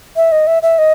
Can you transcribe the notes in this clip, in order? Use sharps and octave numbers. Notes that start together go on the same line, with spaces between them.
E5
D#5
E5
E5
D#5